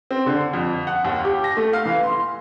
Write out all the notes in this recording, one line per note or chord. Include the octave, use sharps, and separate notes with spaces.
C4
D3
F2
F#5
D#2
G4
A#6
A3
F5
E3
C6